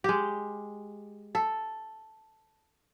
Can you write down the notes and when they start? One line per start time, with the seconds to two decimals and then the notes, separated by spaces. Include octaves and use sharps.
0.04 G#3 G4
1.35 A4